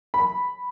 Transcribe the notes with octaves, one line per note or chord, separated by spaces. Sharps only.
B5